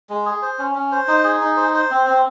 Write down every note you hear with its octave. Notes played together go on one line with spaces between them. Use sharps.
G#3
G#4
C5
C#4
C#4
C5
D#4
G#4
D#4
C5
C5
C4
C4